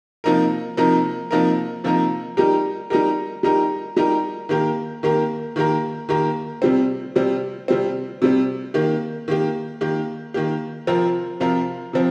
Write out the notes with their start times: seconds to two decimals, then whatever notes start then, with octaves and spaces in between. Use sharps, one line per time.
0.24 C3 F3 A#3 D#4 A#4
0.77 C3 F3 A#3 D#4 A#4
1.31 C3 F3 A#3 D#4 A#4
1.84 C3 F3 A#3 D#4 A#4
2.37 G3 D#4 G4 A#4
2.90 G3 D#4 G4 A#4
3.43 G3 D#4 G4 A#4
3.96 G3 D#4 G4 A#4
4.49 D#3 A#3 G4 A#4
5.03 D#3 A#3 G4 A#4
5.56 D#3 A#3 G4 A#4
6.09 D#3 A#3 G4 A#4
6.62 C3 G3 C4
7.16 C3 G3 C4
7.68 C3 G3 C4
8.22 C3 G3 C4
8.74 D#3 A#3 G4
9.28 D#3 A#3 G4
9.81 D#3 A#3 G4
10.34 D#3 A#3 G4
10.87 C3 F3 C4 F4 A#4
11.40 C3 F3 C4 F4 A#4
11.93 C3 F3 C4